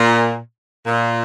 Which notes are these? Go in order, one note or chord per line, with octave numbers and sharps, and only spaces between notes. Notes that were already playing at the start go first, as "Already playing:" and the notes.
Already playing: A#2
A#2